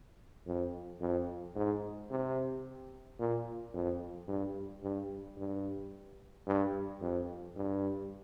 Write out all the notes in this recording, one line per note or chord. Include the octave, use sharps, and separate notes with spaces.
F2
F2
G#2
C3
A#2
F2
G2
G2
G2
G2
F2
G2